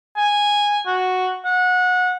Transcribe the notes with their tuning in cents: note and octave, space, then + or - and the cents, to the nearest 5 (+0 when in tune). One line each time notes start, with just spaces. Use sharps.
G#5 -10
F#4 -5
F#5 -25